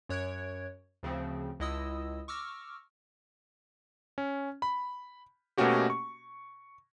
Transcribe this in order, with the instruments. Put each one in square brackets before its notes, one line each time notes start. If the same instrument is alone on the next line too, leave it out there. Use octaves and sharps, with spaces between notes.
[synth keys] F#2 C#5 F#6 G#6 D7
D2 C#3 F3 C4
C#2 E4 D#5 D#6 E6
C#6 D6 E6 F6 A#6
[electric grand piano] C#4
B5
B2 A3 A#3 C#4 F#4 G4
C#6